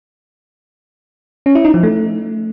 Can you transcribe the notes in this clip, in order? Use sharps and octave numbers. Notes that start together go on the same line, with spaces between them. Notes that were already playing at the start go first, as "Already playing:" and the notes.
C#4
E4
D#4
F3
A3